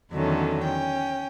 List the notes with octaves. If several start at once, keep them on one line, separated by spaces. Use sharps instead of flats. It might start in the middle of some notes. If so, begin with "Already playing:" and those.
E2 D3 D#3 F#3 A3 C#4
C#4 G5